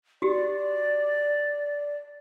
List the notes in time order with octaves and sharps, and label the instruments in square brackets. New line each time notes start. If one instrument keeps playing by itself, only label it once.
[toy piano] F#4 G4 [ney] D5